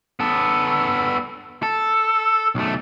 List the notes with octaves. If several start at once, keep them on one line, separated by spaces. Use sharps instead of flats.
B3 A4
A4
B1 A3